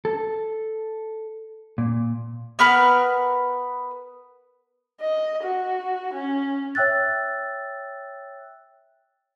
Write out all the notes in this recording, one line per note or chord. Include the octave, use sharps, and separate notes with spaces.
A4
A#2
B3 A#4 B4 F6
D#5
F#4
C#4
C#5 E5 G5 E6 F#6 A6